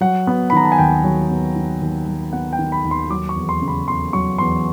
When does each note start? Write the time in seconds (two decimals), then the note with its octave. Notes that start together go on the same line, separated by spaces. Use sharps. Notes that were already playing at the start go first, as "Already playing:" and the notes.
0.01 F#3 F#5
0.27 B3
0.50 B5
0.52 D#3 A#5
0.63 A5
0.72 G#5
0.78 D#2 G5
1.04 F#3
1.30 B3
1.56 D#3
1.81 D#2
2.07 F#3
2.33 B3 F#5
2.53 G5
2.59 D#3
2.72 B5
2.84 D#2
2.91 C6
3.10 F#3 D6
3.29 C#6
3.36 E2
3.49 C6
3.61 C#3
3.68 B5
3.87 E2 C6
4.13 F#3 C#6
4.39 E2 C6